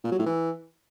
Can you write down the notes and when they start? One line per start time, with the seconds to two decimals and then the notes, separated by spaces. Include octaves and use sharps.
0.04 A#2
0.12 F#3
0.19 A2
0.26 E3